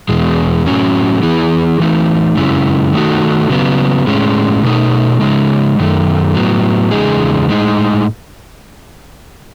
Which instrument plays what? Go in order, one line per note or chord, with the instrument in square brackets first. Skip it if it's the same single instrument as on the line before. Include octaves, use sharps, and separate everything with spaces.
[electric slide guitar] E2 B2 G#3
A2 F#3 C#4
E3 B3 E4 G#4
E3 A3 D#4
F#2 C#3 G#3 C#4 E4
D#3 A3 D#4 F#4
C#3 F#3 B3
A2 G#3 C#4
B2 A3 D#4
C#3 G#3 D#4
F#2 D#3 A3
A2 F#3 B3
E2 C#3 G#3 D#4 G#4
A2 G#3 D#4